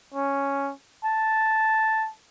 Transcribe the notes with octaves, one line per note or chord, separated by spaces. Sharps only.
C#4
A5